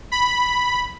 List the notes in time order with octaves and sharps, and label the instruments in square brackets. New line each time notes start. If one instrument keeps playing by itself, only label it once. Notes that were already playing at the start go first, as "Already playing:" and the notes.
[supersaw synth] B5